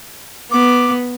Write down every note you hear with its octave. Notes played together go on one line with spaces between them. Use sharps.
B3 D6